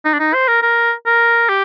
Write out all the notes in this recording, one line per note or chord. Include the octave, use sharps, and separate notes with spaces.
D#4
D4
D#4
C5
A#4
A#4
A#4
G4